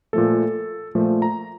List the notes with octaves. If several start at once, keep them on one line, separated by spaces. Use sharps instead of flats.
A#2 F3 A3 A4
A#2 F3 A3
A#5